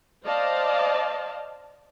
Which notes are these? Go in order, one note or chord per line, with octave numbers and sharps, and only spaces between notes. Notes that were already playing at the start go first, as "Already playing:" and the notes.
C5 D5 D#5 F5 A5